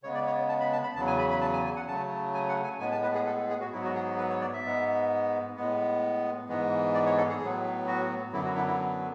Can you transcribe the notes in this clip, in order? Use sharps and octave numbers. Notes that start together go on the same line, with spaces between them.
C#3 G#3 B3 C#5
D5
C#5
A5
B5
A5
B5
E2 C#3 F#3 A5
G#5
B5
B5
A5
G#5
G#5
F#5
C#3 F#3 A3 A5
G#5
F#5
G#5
A2 G#3 B3 G#5
A5
B4
G#4
A4
G#4
F#4
G#2 F#3 B3 E4
F#4
G#4
B4
C#5
D5
E5
G#2 G#3 B3
A2 G#3 B3
G#2 E3 G#3 B3
D5
C#5
A4
G#4
A2 F#3 B3
F#4
F#2 D3 F#3 B3 E4
F#4
E4
E4